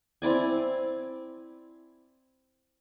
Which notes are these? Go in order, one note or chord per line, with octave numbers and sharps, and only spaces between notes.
C4 E4 D5 G#5